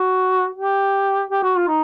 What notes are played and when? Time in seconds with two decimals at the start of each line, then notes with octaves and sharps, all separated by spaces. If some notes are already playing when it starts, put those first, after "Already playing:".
Already playing: F#4
0.55 G4
1.31 G4
1.43 F#4
1.56 F4
1.68 D#4